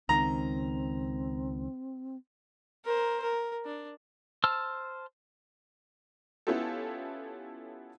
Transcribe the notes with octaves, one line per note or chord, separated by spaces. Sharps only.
C#2 D#3 C4 A#5
A#4 C5
A#4
D4
C5 A5 E6 F6
B3 C#4 E4 F4 G4 A4